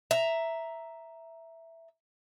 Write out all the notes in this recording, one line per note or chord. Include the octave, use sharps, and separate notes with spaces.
E5 A#5